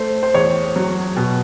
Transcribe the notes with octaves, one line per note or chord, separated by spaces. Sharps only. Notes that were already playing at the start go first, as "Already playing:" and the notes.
Already playing: A3 C5
C5
E2 C#5
F#3
B2